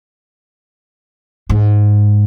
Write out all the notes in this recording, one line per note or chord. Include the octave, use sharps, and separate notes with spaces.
G#2